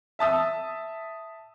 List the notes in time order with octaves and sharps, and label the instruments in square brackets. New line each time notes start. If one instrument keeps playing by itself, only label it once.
[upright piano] E5 A5 D#6 E6